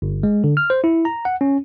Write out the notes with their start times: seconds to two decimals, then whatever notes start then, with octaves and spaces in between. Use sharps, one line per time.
0.02 G1
0.23 G#3
0.44 D3
0.57 F6
0.70 C5
0.84 E4
1.05 A#5
1.25 F#5
1.41 C#4